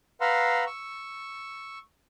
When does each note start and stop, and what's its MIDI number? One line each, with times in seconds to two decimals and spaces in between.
0.21 0.64 71
0.21 0.64 77
0.21 0.64 78
0.21 0.64 82
0.21 0.64 84
0.21 0.64 88
0.66 1.79 85
0.66 1.79 88